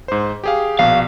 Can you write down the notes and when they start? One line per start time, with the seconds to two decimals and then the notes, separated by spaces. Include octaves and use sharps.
0.08 G#2 C5
0.44 G4 G#4 F5
0.79 A#1 B2 F5